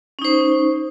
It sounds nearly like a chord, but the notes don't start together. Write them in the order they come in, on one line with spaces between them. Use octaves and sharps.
C#4 D#4 C5